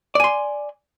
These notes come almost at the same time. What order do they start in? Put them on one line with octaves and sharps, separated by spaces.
D5 G#5 C6